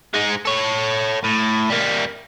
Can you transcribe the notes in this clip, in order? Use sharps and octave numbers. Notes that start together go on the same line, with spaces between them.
G#3 D#4
A4 C#5
A2
G3 A#3